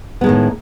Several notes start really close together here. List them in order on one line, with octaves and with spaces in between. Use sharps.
B3 G#3 D#3 A2